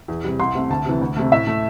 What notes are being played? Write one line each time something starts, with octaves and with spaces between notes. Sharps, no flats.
E2
C3 G3
C2 C6
C3 A3
D2 A5
C3 E3
D2
C3 A3
A2 E5
A3